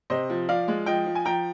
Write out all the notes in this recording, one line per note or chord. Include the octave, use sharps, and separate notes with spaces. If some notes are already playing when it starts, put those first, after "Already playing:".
C3 C5 D#5
F3
F3 D5 F5
G#3
F3 D#5 G5
F3
G#5
F3 G5 A#5